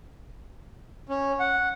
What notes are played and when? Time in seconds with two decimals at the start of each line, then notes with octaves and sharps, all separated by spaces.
1.09 C#4
1.40 F#5